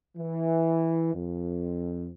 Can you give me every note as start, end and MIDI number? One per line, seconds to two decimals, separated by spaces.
0.17 1.13 52
1.13 2.10 41